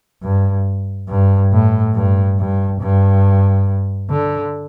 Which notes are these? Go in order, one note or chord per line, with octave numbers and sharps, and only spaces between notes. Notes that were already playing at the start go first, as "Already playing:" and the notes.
G2
G2
A2
G2
G2
G2
D3